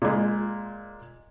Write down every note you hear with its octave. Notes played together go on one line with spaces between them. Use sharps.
A#2 G#3